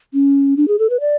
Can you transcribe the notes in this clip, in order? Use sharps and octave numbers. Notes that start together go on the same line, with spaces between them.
C#4
D4
G#4
A4
B4
D5